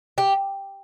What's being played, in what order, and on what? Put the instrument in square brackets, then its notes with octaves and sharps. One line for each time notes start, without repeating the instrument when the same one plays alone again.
[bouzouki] G4